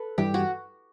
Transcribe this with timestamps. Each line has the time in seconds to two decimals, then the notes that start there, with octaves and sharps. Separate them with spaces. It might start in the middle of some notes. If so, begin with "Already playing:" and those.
Already playing: A4 B4
0.18 G2 E3 G3 G4
0.34 F#4